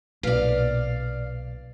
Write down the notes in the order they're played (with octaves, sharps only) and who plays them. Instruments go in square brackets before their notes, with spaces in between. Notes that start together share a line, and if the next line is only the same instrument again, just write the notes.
[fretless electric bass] B1 A#2 [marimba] B4 [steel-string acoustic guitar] D5 F5